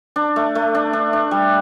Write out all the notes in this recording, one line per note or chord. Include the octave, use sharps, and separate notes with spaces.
D4
A3
A3
D4
D4
D4
G3